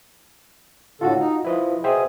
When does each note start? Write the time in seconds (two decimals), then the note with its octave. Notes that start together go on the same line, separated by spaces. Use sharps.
1.01 A2 D3 F4 F#4 A4
1.20 D#4
1.45 F3 E4 B4 D#5
1.84 B2 G#4 C5 E5 G5